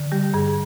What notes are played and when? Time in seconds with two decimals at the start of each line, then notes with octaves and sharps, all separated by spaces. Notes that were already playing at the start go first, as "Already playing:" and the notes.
Already playing: D3
0.12 G3 G4
0.34 G2 G#4